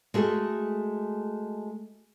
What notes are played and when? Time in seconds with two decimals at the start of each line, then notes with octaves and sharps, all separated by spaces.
0.14 G#3 A3 F#4 G#4 A4